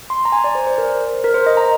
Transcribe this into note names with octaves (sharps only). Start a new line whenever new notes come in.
C6
A#5
G#5
D5
C5
C5
A#4
A#4
C5
D#5
A#5